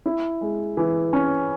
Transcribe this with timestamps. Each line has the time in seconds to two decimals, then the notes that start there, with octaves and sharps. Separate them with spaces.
0.06 E4
0.41 G#3
0.77 E3
1.13 C#4